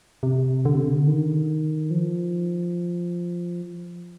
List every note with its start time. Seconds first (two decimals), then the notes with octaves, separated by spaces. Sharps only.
0.23 C3
0.65 D3
0.74 C3
0.83 D3
1.07 D#3
1.91 F3